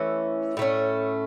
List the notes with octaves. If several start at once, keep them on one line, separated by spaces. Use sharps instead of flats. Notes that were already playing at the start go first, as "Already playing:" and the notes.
Already playing: E3 A3 C#4
A2 A3 C#4